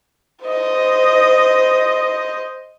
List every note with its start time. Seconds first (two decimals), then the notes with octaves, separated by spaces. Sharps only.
0.45 C5 D#5